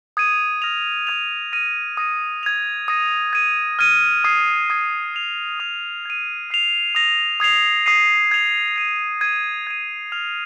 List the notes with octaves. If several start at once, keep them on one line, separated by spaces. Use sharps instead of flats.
D#6 G#6 D#7
F6 A#6 F7
D#6 G#6 F7
F6 A#6 D#7
D#6 A#6 D#7
G#6 F7
D#6 A#6 D#7
G#6 D#7
F6 G#6 D#7
D#6 G#6 C7 D#7
D#6 G#6 D#7
G#6 F7
D#6 G#6 F7
G#6 D#7
F6 C7 F7
D#6 A#6 F7
D#6 G#6 C7 F7
D#6 C7 D#7
G#6 F7
G#6 D#7
G#6 D#7
G#6 D#7
F6 G#6 F7